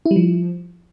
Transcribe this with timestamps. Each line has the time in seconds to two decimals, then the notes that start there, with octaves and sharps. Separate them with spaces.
0.06 E4
0.11 G3
0.16 F3